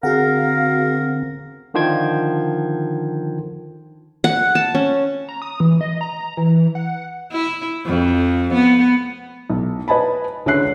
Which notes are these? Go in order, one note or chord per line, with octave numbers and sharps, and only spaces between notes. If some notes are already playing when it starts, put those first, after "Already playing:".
D3 C4 F#4 G#4 A#4 F5 F#5
D3 D#3 F3 C5 G5 G#6
F#5
A5
C#4
A#5
D#6
E3
D#5
A#5
E3
F#5
E4
F2
B3
B1
B4 D#5 G#5 A5 B5
C#2 D3 C#5 E5 F#6 C7